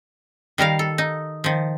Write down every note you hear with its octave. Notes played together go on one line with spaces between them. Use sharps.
D#3 G3 A#4 F5
A4
D#4
D#3 F3